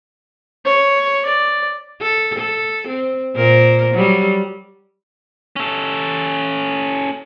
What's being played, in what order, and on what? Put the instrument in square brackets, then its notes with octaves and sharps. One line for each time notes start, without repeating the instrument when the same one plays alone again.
[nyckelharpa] C#5
D5
[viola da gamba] A4
A4
C4
A#2 A#4 C5
F#3 G3
[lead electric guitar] C#4 A4